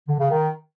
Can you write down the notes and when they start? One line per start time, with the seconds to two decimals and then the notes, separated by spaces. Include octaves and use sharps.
0.07 D3
0.18 C#3
0.29 D#3